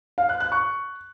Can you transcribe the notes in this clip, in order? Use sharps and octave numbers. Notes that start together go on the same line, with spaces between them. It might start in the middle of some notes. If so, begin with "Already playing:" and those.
F5
F#6
F#6
C#6